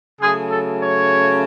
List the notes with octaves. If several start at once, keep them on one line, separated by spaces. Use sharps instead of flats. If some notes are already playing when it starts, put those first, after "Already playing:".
C#3 F#3 A3 G#4
A4
C#5